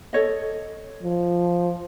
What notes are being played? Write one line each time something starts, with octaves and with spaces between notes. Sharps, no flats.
A4 C#5 D#5
F3